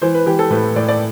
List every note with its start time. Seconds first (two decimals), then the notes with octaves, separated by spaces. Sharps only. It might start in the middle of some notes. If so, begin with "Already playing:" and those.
0.02 E3 C5
0.15 B4
0.26 E3 G4
0.39 A4
0.50 A2 B4
0.76 A2 D5
0.88 D5